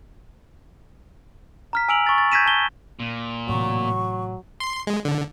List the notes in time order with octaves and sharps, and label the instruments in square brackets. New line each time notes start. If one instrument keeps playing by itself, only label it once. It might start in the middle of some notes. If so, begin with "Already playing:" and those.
[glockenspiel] A#5 F6 B6
G#5 E6 D7 F7 F#7
C#6 A6
A6
G6 G#6 A#6 B6 D#7 E7
A5 G7
[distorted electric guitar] A#2
[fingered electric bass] A2 C3 E3 [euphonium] F#3 [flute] C#6
[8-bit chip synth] C6
G#3
D3